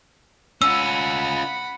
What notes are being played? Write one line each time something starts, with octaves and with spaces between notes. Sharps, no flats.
C#4 F4 F#5 B5 E6